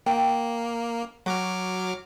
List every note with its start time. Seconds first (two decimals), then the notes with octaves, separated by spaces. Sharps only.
0.06 A#3 G5
1.26 F#3 F#4 D6 F6